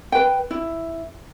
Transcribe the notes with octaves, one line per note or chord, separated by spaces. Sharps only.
B4 G5
E4